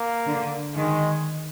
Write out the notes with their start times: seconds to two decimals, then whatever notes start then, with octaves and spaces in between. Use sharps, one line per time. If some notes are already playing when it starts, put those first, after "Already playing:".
Already playing: A#3
0.27 D3
0.76 D#3 G#3